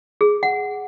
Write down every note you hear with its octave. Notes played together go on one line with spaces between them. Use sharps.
G#4
F#5